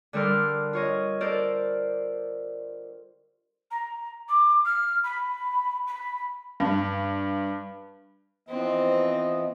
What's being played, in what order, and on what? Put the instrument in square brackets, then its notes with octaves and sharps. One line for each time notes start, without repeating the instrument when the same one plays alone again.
[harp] D3 G3 A4 A#4 C6 F6
F4 C#5 D#5
A4 A#4 C5 D5
[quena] A#5
D6
F6
B5
B5
[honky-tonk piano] G2
[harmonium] E3 F3 B3 [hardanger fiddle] C4 [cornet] D#5